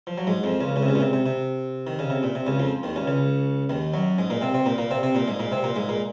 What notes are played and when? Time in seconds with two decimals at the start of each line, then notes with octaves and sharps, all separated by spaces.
0.07 F3
0.18 F#3
0.27 G#2 G#3
0.44 F2 F3
0.60 C#2 C#3
0.76 C#2 C#3
0.83 C3
0.88 C#2 C#3
0.95 A#2
1.00 C3
1.13 C3
1.26 C3
1.87 D#3
1.99 C#3
2.10 C3
2.23 A#2
2.35 C3
2.47 C#2 C#3
2.59 F2 F3
2.83 D#2 D#3
2.96 C#2 C#3
3.07 C#2 C#3
3.69 D#2 D#3
3.94 F#2 F#3
4.18 G#2 G#3
4.30 A#2 A#3
4.42 C3 C4
4.54 C3 C4
4.66 A#2 A#3
4.78 A#2 A#3
4.91 C3 C4
5.03 C3 C4
5.15 A#2 A#3
5.27 G#2 G#3
5.40 A#2 A#3
5.52 C3 C4
5.64 A#2 A#3
5.76 G#2 G#3
5.89 A#2 A#3